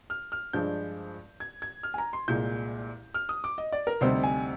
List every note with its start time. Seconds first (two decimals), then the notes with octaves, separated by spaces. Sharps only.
0.10 F6
0.32 F6
0.53 G2 F3 G#3 D4 G6
1.40 G#6
1.62 G#6
1.83 F6
1.94 G#5
1.98 A#5
2.13 C6
2.28 C2 A#2 G#3 G6
3.14 F6
3.29 D#6
3.44 D6
3.58 D#5
3.72 D5
3.87 A#4
4.01 D2 C3 G3 C4 D#4 C5
4.24 G#5